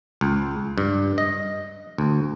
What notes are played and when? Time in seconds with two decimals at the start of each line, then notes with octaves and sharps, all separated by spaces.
0.21 C#2
0.78 G2
1.18 D#5
1.98 D2